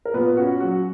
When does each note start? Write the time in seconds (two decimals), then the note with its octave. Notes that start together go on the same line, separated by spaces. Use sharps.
0.05 A#4
0.14 A#2 B3 B4
0.37 C#4 F#4
0.60 F#3 F#4